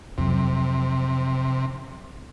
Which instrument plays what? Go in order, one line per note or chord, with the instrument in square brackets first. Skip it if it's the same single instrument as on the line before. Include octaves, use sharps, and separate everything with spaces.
[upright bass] F2 F#3 [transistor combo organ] C3